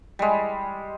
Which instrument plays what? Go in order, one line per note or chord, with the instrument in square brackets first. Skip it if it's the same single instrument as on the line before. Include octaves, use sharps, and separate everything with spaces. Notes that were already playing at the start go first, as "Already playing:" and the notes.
[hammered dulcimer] G3 G#3